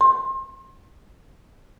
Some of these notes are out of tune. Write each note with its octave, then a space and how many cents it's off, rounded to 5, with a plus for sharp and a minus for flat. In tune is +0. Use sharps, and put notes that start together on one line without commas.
C6 +30